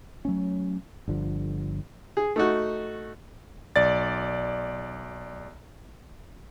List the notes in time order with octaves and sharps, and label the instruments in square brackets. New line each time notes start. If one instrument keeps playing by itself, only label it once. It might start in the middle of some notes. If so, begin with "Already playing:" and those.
[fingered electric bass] F#3 A3 C#4
G1 D3 F3
[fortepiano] G#4
A3 D#4 F#4
[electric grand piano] B1 D5 A6